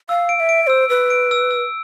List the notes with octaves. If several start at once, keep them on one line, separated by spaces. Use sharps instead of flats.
F5 E6
D7
F5
E5
D7
E5
C5 E6
B4 E6
D7
E6
E6